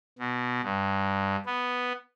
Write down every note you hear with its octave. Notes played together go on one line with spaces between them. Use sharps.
B2
G2
B3